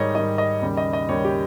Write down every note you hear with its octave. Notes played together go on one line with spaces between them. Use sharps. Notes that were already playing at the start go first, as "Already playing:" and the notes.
Already playing: G#2 D#3 G3 C#5 D#5
G#2 D#3 G3 D#5
D#5
D#2 C#3 G3
D#5
D#5
D#2 C#3 G3 C#5
G4